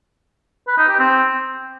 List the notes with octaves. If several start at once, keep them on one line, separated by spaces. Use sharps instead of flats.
B4
D#4
G4
C4